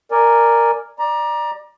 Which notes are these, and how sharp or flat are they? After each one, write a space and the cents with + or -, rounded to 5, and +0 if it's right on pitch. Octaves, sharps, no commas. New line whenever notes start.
A#4 +0 D5 +5 G#5 +0
D5 +20 A#5 +25